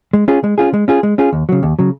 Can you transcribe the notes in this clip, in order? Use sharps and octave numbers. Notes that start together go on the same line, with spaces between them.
G#3
C#4 F4 G#4
G#3
C#4 F4 G#4
G#3
C#4 F4 G#4
G#3
C#4 F4 G#4
D#2
C#3 F#3
D#2
C#3 F#3